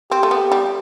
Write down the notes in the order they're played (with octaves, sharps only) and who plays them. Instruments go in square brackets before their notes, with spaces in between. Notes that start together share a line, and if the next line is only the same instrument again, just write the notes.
[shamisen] C4 [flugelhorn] G4
[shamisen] A3
B3
G3